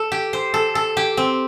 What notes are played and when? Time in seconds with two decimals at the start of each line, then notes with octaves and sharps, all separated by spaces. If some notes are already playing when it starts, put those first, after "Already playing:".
Already playing: A4
0.12 G4
0.33 C5
0.54 A4
0.75 A4
0.97 G4
1.17 C4